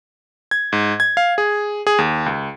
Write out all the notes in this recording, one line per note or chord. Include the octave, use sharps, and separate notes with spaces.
G#6
G#2
G#6
F5
G#4
G#4
D#2
C#2